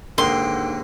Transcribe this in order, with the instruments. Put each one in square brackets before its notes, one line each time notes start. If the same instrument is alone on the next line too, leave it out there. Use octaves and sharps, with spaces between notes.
[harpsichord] D#2 G#2 D3 [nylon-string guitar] D#4 A#4 [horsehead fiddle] G5 [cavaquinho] C6